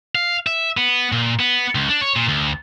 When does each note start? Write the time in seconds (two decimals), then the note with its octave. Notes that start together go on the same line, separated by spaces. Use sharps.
0.15 F5
0.47 E5
0.77 B3
1.12 A#2
1.39 B3
1.75 C#2
1.89 D4
2.01 C#5
2.16 A#2
2.29 D2